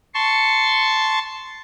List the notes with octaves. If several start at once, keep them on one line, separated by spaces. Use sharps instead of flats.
A5 C6 C#6